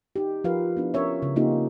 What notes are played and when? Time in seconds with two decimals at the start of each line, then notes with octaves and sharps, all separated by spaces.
0.16 D#4 G4
0.44 F3 F4 G4 A#4 B4 F5
0.77 B3 D4 E4
0.94 C#4 A#4 C#5 E5
1.22 C#3
1.36 A#3 C4 C#4 D#4 F4 G4